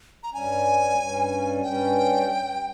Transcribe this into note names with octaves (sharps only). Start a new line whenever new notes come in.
A#5
G2 G3 C#4 G#5
G2 G3 C#4
G2 G3 C#4 G5